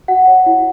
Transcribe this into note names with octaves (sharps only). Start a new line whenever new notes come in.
F#4 F#5
C#5
E4